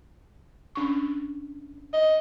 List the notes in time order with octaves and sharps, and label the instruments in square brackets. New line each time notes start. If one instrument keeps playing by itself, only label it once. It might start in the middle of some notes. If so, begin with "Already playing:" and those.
[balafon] C#4 D4 C#6
[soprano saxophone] D#5